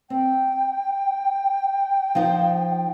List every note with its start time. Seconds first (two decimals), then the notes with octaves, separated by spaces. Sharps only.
0.10 C4 G5
2.15 F3 D#4 C5